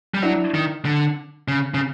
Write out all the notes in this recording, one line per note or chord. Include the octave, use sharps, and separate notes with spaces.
G3
F#3 D4 E4
D#3
D3
C#3
C#3